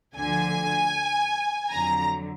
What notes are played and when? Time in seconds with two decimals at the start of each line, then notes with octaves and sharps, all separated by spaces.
0.17 D2 D3 F3 G#5
1.70 F2 D3 F#3 A#5